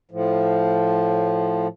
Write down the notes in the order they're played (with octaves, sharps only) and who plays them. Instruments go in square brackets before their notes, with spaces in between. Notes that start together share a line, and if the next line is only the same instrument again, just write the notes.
[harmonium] A2 F3